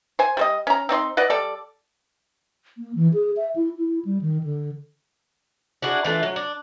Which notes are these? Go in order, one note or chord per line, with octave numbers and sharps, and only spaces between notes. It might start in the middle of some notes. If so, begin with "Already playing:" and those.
C5 G#5
G3 C5 D#5
C#4 A#5
C4 D#4 D5 C6
B4 D5 D#5 F#5
G3 A4 D5
A#3
E3
G#4
E5
E4
E4
G3
D#3
D3
D4 E4 F#4 G#4
E3 A3 D4 F4
F#3
D4